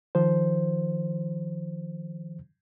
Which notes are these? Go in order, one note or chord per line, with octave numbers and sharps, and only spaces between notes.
D#3 F3 C5